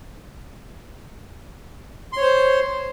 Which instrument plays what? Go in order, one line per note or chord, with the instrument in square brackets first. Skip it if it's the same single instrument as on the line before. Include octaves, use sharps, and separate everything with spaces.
[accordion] C6
C#5
C5